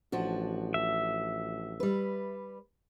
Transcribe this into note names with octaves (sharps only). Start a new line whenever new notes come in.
A1 F3 D4 F#4
E5
G3 B4